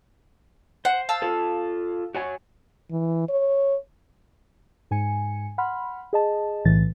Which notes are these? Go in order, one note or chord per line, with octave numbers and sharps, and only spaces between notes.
C5 F#5
F5 A5 E6
F4 A4
F#4 C#5 G#5
E3
C#5
G#2 G#5 C#7
F#5 B5 C6 F6
G#4 D#5 A5
B1 A2 E3 A6